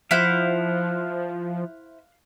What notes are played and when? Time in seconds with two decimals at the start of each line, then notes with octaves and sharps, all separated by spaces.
0.11 F3 E4 C5 F5 F#5